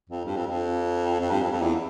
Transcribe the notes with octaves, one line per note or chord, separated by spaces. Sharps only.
F2
G2
F2
F2
F2
G2
F2
F2
E2